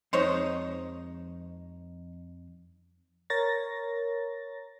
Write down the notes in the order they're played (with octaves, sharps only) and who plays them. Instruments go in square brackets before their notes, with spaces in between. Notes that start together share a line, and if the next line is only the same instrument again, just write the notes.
[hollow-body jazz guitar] F2 G#3 D#4 [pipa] C5 C#5 D#5
[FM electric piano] A#4 C#5 A6 A#6